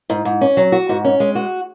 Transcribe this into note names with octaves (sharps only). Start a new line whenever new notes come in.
G#2
G#2
C#4
F#3
F#4
G#2
C#4
G#3
F#4